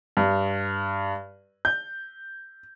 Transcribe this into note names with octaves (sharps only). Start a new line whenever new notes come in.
G2
G6